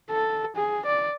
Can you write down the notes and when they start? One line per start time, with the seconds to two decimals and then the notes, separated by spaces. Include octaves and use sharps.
0.11 A4
0.56 G#4
0.86 D5